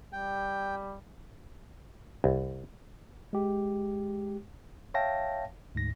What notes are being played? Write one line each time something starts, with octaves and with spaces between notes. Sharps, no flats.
G3 G5
C2
G#3 G4
C#5 E5 F5 G5 A5 A#6
D2 G#2 A#6